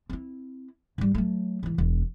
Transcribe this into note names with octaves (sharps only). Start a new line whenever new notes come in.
C4 E4
G#2 G3
F#3 A3
G#2 E3
E1 E2